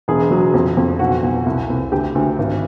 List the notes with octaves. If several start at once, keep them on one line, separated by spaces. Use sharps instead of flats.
E1 G#4
F#3
F2
F2
B1 F#4
B1
C2
C2
D2 G4
D2
G#1